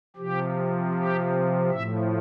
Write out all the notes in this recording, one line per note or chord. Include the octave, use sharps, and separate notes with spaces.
C3 F3 G4
G4
A2 F3 E5